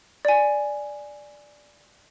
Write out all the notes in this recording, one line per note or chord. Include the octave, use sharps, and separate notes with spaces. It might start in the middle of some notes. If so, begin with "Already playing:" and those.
D5 G#5